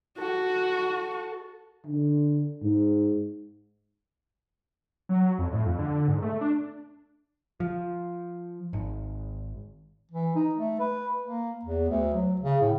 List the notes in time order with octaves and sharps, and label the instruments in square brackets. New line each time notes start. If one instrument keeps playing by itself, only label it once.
[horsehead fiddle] F#4 [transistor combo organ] A4
[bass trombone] D3
G#2
[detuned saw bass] F#3
F2
A2
F2
D3
G#2
A3
D4
[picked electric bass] F3
G#1
[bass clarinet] E3
D#4
A3
B4
A#3
E2
D2
F#3
C#3
A2